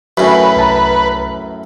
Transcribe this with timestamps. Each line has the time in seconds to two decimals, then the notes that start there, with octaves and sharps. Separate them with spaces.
0.17 F#2 A2 F#4 B4 C#5 G#5
0.57 C2 A5 A#5